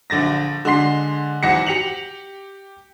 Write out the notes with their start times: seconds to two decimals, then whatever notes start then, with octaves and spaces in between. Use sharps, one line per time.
0.10 A#1 D3 A6 A#6
0.65 D3 G#3 C6 C7
1.43 G#1 E2 F#5 A#6 C#7
1.66 G4 C#7 F7 F#7